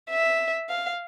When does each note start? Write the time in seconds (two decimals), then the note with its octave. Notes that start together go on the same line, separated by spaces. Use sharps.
0.10 E5
0.69 F5